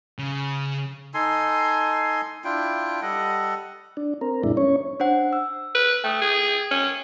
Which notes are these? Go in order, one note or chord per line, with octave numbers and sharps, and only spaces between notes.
C#3
D#4 A4 G#5 C6
D4 E4 F4 G5
G3 A4 D#5 F#5
D4
C4 A#4
F#2 A#2 G#3 D4 E4
C#4 C#5
D4 C5 F#5
E6
B4
A3 G5 D#6
G#4
C#4